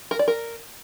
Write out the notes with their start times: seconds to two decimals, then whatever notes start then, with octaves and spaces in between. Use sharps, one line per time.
0.11 A#4
0.19 D5
0.28 A#4